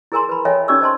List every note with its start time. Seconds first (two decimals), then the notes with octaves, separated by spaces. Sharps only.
0.12 E4 G#4 A#4 G#5 A#5 C6
0.29 B4 B5
0.45 A4 C#5 D#5 E5 G5 G#5
0.68 C#4 D#4 G4 D5 D6 E6
0.81 C5 D#5 A5 C6